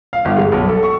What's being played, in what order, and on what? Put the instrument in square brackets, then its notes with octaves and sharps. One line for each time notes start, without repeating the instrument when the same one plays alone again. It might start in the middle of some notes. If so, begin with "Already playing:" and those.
[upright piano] F5
G1
G#3
B1
A4
C#6